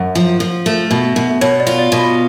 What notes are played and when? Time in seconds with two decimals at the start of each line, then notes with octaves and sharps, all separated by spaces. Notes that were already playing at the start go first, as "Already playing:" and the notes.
Already playing: F#2 F#5
0.15 F3
0.40 F3
0.66 A3
0.91 B2
1.16 B2
1.41 B2 C#5
1.60 D5
1.67 F4
1.79 D5
1.92 B2
1.98 B5